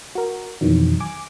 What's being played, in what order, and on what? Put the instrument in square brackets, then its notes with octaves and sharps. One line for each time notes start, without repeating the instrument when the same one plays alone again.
[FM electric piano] F#4 A#4
F2 B2 D#3 E3 F#3
G#5 D6